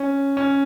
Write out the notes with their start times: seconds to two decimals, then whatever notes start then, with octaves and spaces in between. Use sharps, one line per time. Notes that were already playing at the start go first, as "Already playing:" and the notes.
Already playing: C#4
0.37 C#4